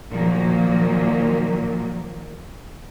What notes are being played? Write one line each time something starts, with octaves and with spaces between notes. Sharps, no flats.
A#2 D#3 F3 F#3 A#3